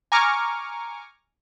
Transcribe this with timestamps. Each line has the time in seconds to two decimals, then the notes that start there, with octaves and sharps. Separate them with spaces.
0.12 G#5 A#5 C#6 D6 F6